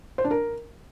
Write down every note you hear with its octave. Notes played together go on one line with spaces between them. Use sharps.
C5
D4
A#4